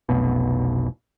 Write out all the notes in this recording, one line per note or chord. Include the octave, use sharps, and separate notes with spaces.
F1 B1 B2